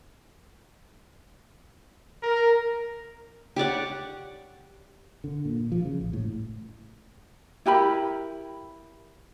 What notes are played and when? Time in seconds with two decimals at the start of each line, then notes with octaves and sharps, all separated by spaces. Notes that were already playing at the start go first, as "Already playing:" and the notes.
2.23 A#4
3.56 G4 C#5 D5 F#5
5.24 D3
5.45 A#2
5.72 F3
5.85 C#3
6.01 A1
6.13 A2
7.66 E4 G4 A#4 B5